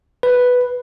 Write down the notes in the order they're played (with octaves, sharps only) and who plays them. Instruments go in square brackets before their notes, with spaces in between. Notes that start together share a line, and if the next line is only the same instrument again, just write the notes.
[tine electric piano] B4